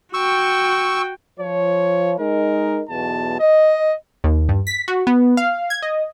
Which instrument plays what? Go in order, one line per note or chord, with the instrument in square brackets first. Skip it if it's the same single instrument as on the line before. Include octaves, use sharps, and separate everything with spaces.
[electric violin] F#4 G5 [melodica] C#6 E6
[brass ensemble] F3 C#5
G#3 D#4 A#4
B1 E2 B2 A5
D#5
[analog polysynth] D#2
G2
B6
F#4
B3
F5
G#6
D#5